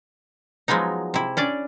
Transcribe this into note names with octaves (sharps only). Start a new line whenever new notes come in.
F3 F#3 G#3 B3 D#4
C3 E4
C#4 D4 D5